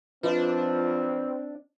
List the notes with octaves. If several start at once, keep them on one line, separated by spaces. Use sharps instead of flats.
F3 C4 D4 F4 B4 D#5